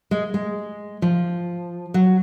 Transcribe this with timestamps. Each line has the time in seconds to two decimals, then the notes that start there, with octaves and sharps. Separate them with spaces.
0.11 G#3
0.34 G#3
1.02 F3
1.94 F#3